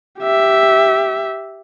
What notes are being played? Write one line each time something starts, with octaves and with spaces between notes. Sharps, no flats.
G4 E5